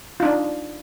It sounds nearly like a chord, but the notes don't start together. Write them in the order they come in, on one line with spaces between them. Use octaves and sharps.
F4 D#4 D4